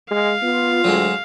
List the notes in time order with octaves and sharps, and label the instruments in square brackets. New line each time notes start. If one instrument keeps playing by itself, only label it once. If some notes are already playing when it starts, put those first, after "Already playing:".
[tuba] G#3 [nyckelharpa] F5
[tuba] B3 [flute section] F4
[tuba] D2 [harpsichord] F#3 G#3